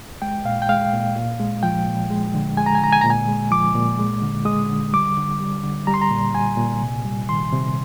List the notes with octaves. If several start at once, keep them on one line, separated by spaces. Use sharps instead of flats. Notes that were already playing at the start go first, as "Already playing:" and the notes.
G#3 G5
A#2 F5
G5
G#3 F5
A#2
A#2
G#3
F3 G5
A#2
G#3
D3
G#3 G#5
A#5
G#5
D3 A#5
G#5
A#2 A#5
G#5
G#3
F3 D6
A#2
G#3
D3
G#3 D#6
D3
G3 D6
D3
G3
D3
G3 A#5
C6
A#5
A#2
G3 G#5
A#2
C3
G3
D#3 C6
C3